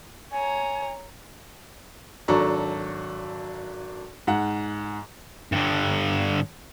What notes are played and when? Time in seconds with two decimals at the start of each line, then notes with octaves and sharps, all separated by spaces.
0.32 C#5 G#5 A#5
2.28 G#1 F#3 D4 A4 A#5 C#6
4.27 G#2 F#5
5.52 G2 D3